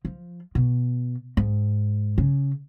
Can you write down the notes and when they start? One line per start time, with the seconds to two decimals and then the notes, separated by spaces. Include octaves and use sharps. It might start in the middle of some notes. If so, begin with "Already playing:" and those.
0.05 F3
0.55 B2
1.37 G#2
2.18 C#3